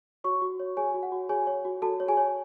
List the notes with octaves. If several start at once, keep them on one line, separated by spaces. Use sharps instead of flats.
F#4 C#5 C#6
F#4
C#5
G#4 C#5 G#5
F#4
F#5
F#4
G#4 C#5 G#5
C#5
F#4
F#4 A4 A5
C#5
G#4 G#5
C#5